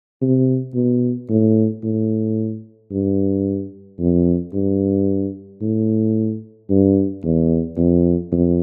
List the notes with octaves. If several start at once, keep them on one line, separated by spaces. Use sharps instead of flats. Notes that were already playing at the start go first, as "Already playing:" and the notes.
C3
B2
A2
A2
G2
F2
G2
A2
G2
E2
F2
F2